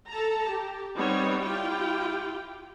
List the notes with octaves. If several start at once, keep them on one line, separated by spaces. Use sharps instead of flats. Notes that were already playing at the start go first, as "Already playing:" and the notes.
A4 A5 A#5
G4
G3 B3 C4 D#4 C#5
E4 F4 G4 G5